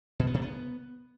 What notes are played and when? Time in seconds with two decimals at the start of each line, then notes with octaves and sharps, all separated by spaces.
0.19 B2
0.27 B3
0.34 C3
0.42 B3